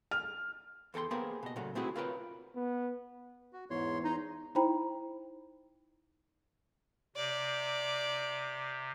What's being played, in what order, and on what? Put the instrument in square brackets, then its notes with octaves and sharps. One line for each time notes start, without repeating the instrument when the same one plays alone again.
[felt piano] F6
[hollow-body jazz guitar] E2 A4 G5 A5 C6
A#3 B3 G4 G#4 A#4 C5
B2 D#5
A#2 C#3 F#3 A3
A3 C4 E4 F#4 G#4
F4 A#4 B4 C#5 D#5 G5
[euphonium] B3
[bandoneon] F#4
[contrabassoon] E2 [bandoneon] G#2 C#5 C6
[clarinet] D#4 [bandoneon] A#5 C6
[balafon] D#4 E4 C5 G5 A#5 B5
[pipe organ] C3 [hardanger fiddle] D5